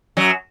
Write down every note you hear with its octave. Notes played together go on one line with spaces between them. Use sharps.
F#2 F#3